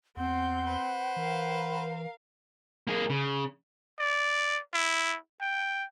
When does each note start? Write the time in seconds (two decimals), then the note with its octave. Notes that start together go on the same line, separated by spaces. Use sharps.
0.17 E2 C4 F#5 C6 G6
0.67 B4 C5
1.16 E3 A#4 F5
2.87 A#3 G#4
3.10 C#3
3.99 D5
4.73 E4
5.41 G5